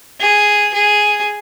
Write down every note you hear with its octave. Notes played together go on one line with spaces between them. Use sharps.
G#4
G#4